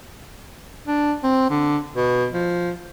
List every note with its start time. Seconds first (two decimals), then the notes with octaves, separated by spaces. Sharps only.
0.87 D4
1.23 C4
1.50 D3
1.95 B2
2.32 F3